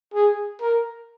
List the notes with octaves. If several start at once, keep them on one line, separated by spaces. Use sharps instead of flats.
G#4
A#4